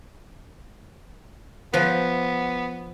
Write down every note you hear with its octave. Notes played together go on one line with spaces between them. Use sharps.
F3 B3 B4